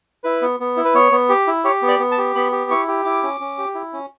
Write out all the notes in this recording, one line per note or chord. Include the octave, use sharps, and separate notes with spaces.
E4 B4
B3
B3
E4
B4
B3 C#5
B3
G4
E4
G4 C#5
B3
D5
B3
A5
G4
B3 B5
G4
E4 C#6
G4
E4 D6
C#4
C#4
G4
E4
C#4